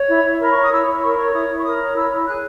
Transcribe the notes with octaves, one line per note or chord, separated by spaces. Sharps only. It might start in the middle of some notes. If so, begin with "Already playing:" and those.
Already playing: C#5
E4
E4
A#4 B5
C#5 C#6
D#6
E4 E6
E4 E6
A#4 C#6
C#5 C#6
E4 D#6
E4
C#6
A#4 D#6
C#5
E4 E6
E4
G#4 F#6